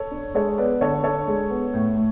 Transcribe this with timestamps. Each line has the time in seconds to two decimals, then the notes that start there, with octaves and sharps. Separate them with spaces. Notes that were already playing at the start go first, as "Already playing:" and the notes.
Already playing: A4 C#5
0.11 D4
0.34 G#3 A4 C#5
0.58 B3 B4 D5
0.81 D3 A4 C#5
1.03 D4 A4 C#5
1.27 G#3
1.50 B3
1.74 A2
1.96 A2